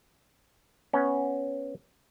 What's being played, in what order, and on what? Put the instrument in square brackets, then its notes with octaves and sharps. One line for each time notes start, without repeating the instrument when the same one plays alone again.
[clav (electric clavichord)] B3 C#4